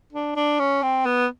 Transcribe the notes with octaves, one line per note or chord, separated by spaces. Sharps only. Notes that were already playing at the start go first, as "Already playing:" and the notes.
D4
D4
C#4
C4
B3